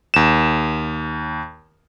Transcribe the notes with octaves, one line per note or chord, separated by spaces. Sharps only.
D#2 E7